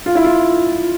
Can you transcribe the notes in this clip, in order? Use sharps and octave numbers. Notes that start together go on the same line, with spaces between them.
F4
E4
F4